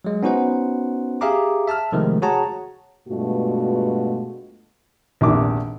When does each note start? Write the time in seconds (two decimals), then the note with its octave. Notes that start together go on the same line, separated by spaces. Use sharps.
0.05 F#3 G#3
0.23 B3 C#4 D#4 F#4 C5 F#5
1.21 G4 G#4 E5 F5 A#5 D6
1.67 E5 A5 E6 F6
1.92 C3 D#3 F3 G#3 A3
2.22 F#4 G#4 C#5 F#5 A5 A#5
3.08 G2 B2 G#3 A3 F4 F#4
5.21 A#1 E2 C3 D#3 D6